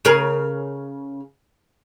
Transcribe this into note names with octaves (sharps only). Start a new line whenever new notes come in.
C#3 G#4 A#4